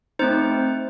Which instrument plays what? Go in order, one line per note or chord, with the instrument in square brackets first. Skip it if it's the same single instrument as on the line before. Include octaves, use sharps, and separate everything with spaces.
[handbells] A3 C4 D#4 C5